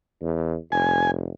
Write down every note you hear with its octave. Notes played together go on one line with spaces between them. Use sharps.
E2
F1 G#5